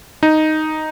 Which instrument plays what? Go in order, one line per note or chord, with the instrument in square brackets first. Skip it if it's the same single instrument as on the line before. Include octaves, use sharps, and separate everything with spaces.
[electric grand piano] D#4